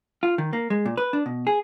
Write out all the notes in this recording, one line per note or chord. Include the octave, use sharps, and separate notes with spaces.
F4
D#3
A#3
G#3
A#2
B4
D4
B2
G#4